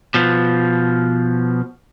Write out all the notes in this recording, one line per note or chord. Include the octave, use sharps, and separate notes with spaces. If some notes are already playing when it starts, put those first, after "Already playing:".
B2 F3